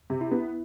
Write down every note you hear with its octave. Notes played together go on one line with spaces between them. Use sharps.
C3
E4
B3